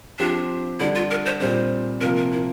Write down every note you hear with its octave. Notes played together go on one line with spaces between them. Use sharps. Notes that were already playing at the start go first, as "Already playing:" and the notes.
F3 C4 D4 G4
D3 G3 D4 E4
F4
A#4
C5
A#2 G3 C4 C5
C3 F3 A#3 A#4
A#4
E4